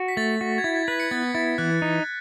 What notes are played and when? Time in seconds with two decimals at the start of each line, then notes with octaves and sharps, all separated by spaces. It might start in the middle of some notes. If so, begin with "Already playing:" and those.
Already playing: F#4
0.08 B6
0.17 A3 A6
0.41 F#4
0.58 G#6
0.64 E4 A6
0.76 A6
0.87 B4 B6
1.00 C#7
1.11 B3 A6
1.35 E4 A6
1.58 E3 F#6
1.82 D#4